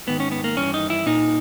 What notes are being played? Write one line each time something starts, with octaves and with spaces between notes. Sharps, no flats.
G#2 D#3 B3
C#4
B3
A#3
G2 E3 C#4
D#4
E4
A#2 D#4